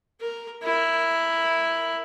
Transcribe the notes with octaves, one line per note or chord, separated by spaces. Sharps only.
A#4
E4 A#4